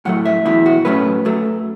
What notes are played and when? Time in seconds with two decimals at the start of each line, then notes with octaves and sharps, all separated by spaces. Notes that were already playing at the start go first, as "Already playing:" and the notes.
0.05 A2 F#3 A3 F#5
0.25 E5
0.45 E2 B2 B3 E4 E5
0.66 F#4
0.85 A2 F#3 A3 C#4 B4
1.25 F#2 F#3 A3